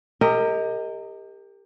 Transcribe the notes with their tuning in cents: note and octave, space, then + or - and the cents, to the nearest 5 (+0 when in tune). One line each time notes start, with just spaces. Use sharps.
G4 +25 A#4 -25 D#5 +20